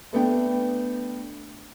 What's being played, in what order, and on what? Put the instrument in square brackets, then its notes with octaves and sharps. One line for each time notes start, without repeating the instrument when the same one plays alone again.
[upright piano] A3 B3 D4 G5